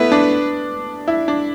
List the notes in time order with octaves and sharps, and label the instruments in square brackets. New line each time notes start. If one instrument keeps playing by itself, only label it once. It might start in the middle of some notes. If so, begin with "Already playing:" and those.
Already playing: [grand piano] A3 B3 E4 [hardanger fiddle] B4
[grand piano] D4
E4
D4